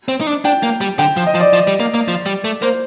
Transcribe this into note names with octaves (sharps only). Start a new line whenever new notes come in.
C4
D#4
D4
D4 G5
A#3
G3
D3 G5
F3
D#5
F3
D5
F3
G3
A#3
A#3
F3
G3
A3
A#3 C5